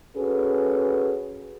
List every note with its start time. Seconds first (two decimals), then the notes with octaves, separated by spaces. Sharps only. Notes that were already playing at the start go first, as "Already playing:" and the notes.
0.16 C#4 F#4 G#4 A4 B4